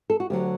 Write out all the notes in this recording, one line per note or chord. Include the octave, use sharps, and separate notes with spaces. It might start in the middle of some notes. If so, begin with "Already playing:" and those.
A4
F#4
D2 D3 F#3 G4